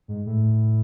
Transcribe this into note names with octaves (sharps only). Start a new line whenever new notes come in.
G#2
A2